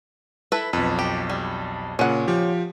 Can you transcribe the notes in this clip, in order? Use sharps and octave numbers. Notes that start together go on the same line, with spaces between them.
E4 A4 B4
B1 F2 B4
G4
G3
A#2 C#3 C#4 F#5
F3 G4